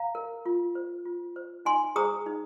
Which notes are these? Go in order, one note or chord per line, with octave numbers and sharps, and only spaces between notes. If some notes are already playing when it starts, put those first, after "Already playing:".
Already playing: F5 A#5
A#4
F4
C5
F4
C5
D#4 G#5 C6
G#4 C5 A#5 D#6
D#4